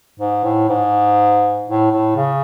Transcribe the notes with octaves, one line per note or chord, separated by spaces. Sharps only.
G#2
A2
G#2
A2
A2
C#3